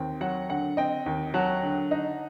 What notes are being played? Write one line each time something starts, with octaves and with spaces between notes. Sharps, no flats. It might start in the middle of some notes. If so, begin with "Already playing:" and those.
Already playing: D#2 C4
F#3 F#5
D3 F#5
C4 D#5 G5
D#2
F#3 F#5 A5
D3
D#4